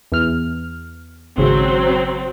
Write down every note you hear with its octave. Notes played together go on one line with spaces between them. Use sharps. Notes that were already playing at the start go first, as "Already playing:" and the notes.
E2 F6
G#1 C#3 F#3 C4